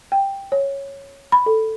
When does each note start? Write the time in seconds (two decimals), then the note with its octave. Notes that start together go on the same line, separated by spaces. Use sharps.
0.12 G5
0.52 C#5
1.32 B5
1.46 A4